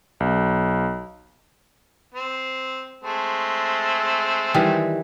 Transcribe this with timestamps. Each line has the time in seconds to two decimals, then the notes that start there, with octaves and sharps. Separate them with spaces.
0.20 B1
2.14 C4
3.04 G#3 A3 C4
4.54 D#3 E3 G3